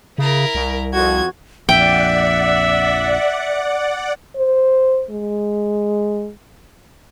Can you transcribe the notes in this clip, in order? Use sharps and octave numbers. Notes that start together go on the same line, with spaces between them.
C#3 E4 A#4
C2
F2 F#4 G#6
A#1 F2 D5 E5 F#5 G5
C5
G#3